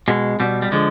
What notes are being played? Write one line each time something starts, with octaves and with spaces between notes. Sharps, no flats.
B2 G#3
B2 G3
G3
D3 F3 G#3